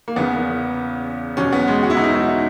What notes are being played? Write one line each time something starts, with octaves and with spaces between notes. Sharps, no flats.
A#3
E2 C#3 E3 B3
E2 B2 F#3 C#4
B3
G#3
F#4
E4
D#4
E4